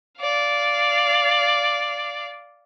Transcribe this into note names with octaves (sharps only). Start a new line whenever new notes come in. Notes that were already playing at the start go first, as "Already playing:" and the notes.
D5 F5